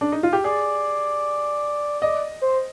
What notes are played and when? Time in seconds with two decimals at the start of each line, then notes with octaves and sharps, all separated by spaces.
0.01 D4
0.12 D#4
0.23 F4
0.33 G4
0.44 G#4 D5
2.02 D5 D#5
2.42 C5